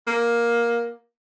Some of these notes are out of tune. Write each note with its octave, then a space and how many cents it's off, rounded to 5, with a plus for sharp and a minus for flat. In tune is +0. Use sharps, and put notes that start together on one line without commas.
A#3 +10